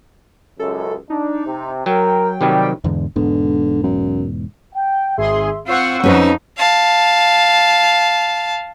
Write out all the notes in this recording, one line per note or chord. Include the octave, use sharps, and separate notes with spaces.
C#2 F#2 A4
D4 D#4
C3
F#3 A#4 G5
C3 D#3 F#3 G3
E2 G#2 D3
E1 G#2 D3 B3
F#2
G5
G#1 G#4 E5 C6
C4 F4 C5 F#5 C#6 E6
F2 C#4 D#4 B4 C5
F5 A5